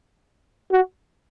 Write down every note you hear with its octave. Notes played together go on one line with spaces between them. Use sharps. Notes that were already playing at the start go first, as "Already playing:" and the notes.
F#4